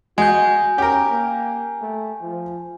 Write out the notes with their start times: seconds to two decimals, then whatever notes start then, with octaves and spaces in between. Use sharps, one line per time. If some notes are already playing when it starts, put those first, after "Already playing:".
0.18 G#3 F#4 G#5 G6
0.78 C#4 G4 A#4
1.10 A#3
1.82 A3
2.22 F3